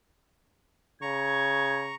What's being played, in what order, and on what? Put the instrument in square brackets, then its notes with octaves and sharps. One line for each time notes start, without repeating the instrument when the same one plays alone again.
[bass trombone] C#3 [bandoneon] A#5 C#6 [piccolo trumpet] G#6